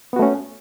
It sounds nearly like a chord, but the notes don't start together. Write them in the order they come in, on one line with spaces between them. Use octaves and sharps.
B3 F#4 A3 C#4